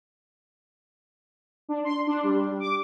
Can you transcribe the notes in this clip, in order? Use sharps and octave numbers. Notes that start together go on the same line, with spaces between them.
D4
C6
D4
G3
D6